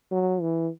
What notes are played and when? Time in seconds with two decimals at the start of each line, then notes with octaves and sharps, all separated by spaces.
0.12 F#3
0.41 E3